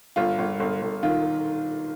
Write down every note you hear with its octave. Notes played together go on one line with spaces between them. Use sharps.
G1 F4
G1
G1
G1
D#3 F4